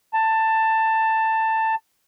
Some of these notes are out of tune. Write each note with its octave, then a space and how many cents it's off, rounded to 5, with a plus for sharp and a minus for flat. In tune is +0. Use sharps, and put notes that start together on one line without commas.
A5 +15